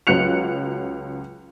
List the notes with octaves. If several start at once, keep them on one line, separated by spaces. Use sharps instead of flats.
C#2 F#3 F#6 C#7 F7